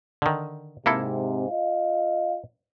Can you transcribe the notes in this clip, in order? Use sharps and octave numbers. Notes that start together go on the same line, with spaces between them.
D3 D#3
G#2 C3 A#3 E4 A4
F4 D#5 F5